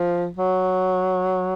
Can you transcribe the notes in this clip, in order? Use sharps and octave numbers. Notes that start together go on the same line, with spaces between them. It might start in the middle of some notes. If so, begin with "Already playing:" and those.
Already playing: F3
F#3